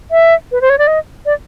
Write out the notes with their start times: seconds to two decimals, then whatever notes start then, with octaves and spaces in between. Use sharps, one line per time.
0.11 E5
0.52 B4
0.61 C5
0.69 C#5
0.78 D5
0.87 D#5
1.26 D5